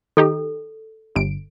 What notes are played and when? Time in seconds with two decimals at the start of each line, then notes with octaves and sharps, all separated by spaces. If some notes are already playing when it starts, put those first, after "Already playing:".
0.17 D#3 D#4 G4 A4
1.15 G1 D7